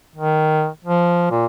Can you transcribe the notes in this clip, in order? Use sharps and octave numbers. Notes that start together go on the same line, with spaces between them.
D#3
F3
A#2